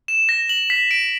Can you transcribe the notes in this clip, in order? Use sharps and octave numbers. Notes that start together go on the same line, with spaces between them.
E7
A#6
F#7
B6
D7